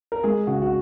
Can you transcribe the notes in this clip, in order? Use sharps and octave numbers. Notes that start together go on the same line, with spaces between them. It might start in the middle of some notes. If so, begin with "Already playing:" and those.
A#4
G#3 G#4
C#3 F#4
F#4